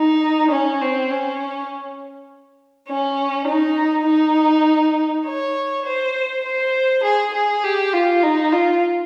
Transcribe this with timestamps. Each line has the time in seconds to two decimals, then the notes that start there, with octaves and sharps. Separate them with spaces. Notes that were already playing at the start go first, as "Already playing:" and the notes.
Already playing: D#4
0.51 C#4
0.81 C4
1.11 C#4
2.89 C#4
3.48 D#4
4.07 D#4
5.26 C#5
5.86 C5
6.45 C5
7.04 G#4
7.34 G#4
7.64 G4
7.93 F4
8.23 D#4
8.53 F4